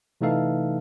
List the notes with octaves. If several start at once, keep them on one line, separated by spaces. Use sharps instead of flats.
C3 E3 A3 D#4 A4 F5